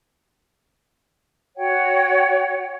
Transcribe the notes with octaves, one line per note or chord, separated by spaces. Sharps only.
F#4 C#5 F#5 G5